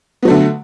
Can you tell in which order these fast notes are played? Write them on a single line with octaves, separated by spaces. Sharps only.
B3 F#3 A3 D3